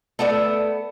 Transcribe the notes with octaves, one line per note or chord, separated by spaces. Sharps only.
A3 B3 A4 D5